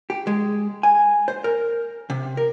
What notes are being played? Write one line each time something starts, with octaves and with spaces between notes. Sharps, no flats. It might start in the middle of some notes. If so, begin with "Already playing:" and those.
G4
G#3
G#5
C5
A#4
C3
A#4